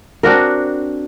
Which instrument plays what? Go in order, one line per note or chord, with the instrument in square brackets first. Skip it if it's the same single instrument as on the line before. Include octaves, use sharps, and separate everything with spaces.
[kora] C4 D4 F#4 A#4